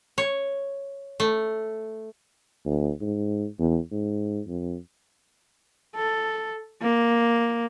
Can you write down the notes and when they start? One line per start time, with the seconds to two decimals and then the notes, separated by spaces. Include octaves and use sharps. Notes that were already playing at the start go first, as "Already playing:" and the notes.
0.18 C#5
1.20 A3
2.66 D2
3.01 G#2
3.59 E2
3.91 G#2
4.47 F2
5.96 A4
6.82 A#3